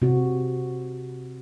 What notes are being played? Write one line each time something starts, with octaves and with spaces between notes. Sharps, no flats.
C3 C4 F#4